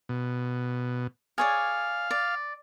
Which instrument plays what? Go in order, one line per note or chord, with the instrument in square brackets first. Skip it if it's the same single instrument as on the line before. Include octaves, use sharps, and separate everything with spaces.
[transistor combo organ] B2
[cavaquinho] G#4 C#5 D5 [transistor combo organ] F5
[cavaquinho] D5